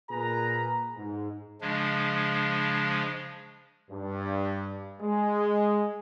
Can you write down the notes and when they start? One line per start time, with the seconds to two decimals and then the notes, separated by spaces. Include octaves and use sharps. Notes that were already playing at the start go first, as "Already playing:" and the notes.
0.10 A#2 G#4 A#4 B4 A#5
0.96 G#2
1.61 C#3 F3 G#3 D4
3.90 G2
5.01 G#3